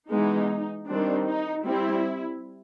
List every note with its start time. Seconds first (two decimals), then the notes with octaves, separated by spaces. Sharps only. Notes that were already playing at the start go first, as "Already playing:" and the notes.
0.10 E3 G#3 B3 D#4
0.88 D#3 G3 C4 D4
1.27 D#4
1.65 G3 C4 E4